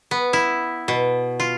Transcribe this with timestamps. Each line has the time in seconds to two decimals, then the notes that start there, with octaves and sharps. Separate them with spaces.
0.11 B3
0.33 E4
0.88 B2
1.40 F4